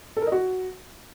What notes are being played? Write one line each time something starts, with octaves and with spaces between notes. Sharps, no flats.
A4
A#4
D#5
F#4